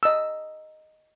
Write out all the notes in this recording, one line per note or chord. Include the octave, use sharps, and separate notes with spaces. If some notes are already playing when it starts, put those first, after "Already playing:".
D#5 E6